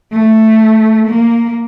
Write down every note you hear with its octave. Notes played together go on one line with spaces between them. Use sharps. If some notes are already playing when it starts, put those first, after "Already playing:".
A3
A#3